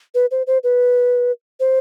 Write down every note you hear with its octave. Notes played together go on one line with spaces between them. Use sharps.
B4
C5
C5
B4
C5